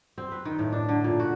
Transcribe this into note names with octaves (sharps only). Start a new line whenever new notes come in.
C4
B4
D#3
A2
D4
D3
A#2
F#4